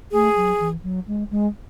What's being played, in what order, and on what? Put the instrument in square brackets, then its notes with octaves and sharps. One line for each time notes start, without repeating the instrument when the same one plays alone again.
[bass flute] A3 [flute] G#4
[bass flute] F#3
E3
F#3
G#3
G#3